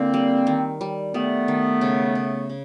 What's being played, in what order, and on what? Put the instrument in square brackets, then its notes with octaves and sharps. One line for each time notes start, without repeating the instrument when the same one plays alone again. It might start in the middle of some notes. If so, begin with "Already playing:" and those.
Already playing: [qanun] D3 E4 [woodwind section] A#3 C4
[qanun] G3
D#3
G3
[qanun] G3 [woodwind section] A3 B3
[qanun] D#3
C#3
C#3
C#3